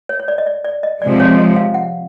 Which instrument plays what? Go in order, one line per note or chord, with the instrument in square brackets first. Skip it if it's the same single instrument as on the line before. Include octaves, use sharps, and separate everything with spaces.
[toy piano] C#5
C#5
D5
D#5
D5
D5
D#5
[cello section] C3 F3 G#3 [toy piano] D5
[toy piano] C#5
D#5
F5
F#5